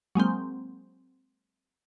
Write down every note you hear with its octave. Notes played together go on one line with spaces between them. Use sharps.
F#3 G#3 A#3 C4